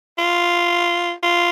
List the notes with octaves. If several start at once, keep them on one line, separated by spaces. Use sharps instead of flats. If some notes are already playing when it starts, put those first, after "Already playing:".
F4
F4